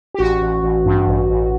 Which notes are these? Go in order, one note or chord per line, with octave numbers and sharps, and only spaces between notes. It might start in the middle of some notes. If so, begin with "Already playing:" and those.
G4
A1 F#4
A1
A1
G2
A1
A1